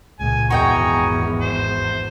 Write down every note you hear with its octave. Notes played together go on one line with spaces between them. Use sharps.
C#2 A#2 G#5
G#1 E2 F#4 D#5 G5 G#5 A#5 C#6
C5